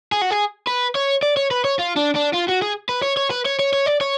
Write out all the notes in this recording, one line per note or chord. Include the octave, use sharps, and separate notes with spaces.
G#4
F#4
G#4
B4
C#5
D5
C#5
B4
C#5
F4
D4
D4
F4
F#4
G#4
B4
C#5
C#5
B4
C#5
C#5
C#5
D5
C#5